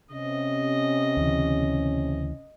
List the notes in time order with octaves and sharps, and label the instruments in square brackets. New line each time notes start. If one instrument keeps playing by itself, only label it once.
[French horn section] C3 C#4 [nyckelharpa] D#5
[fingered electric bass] D2 C#3 E3